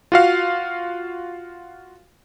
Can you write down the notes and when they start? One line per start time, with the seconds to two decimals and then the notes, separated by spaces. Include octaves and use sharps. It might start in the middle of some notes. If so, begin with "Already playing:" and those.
0.12 F4 F#4 F5